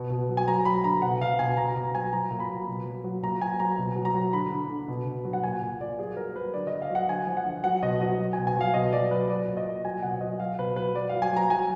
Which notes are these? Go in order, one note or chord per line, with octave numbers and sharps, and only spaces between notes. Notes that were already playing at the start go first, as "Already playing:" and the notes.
Already playing: B2
B2
F#3
G#5
F#3 A#5
F#3 B5
D3 A#5
B2 F#5
B2 F5
B2 G#5
B2 A#5
B2 A#5
F#3 G#5
F#3 A#5
A#2
B5
F#3
B2
F#3
F#3
A#2 A#5
F#3 G#5
F#3 A#5
B2
F#3
A#5
F#3
D3 B5
D3
D3
B2
B2
F#3
F#5
A#2 G#5
A#2
A#2 D5
F#3 G#4
F#3 A#4
F#3 B4
D3 D5
D#5
D3
F5
F#3 F#5
D3 G#5
F3
F#5
D3
F#3 F#5
B2 D#5
F#3 D#5
F#3
B2 G#5
G#5
F#3 F5
B2 D#5
F#3 D5
F#3 B4
F#3 D5
A#2
D#5
A#2
F#3 G#5
B2 F#5
F#3 D#5
F#3 F5
B2 B4
F#3 B4
F#3 D5
F#3 F5
G#5
F#3 A#5
F#3 G#5